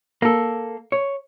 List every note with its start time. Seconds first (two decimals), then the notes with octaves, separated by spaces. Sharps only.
0.22 A#3 A4
0.92 C#5